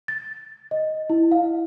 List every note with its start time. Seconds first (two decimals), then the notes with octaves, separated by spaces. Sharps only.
0.08 A6
0.71 D#5
1.10 E4
1.32 F5